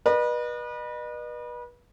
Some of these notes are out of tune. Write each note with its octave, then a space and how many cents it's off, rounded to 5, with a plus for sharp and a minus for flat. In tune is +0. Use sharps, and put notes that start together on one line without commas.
B4 -30 D#5 -45